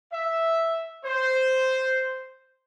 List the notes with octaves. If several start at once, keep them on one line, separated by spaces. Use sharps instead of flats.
E5
C5